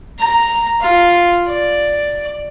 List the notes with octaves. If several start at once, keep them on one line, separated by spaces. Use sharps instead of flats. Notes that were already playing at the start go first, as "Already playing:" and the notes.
A#5
F4
D5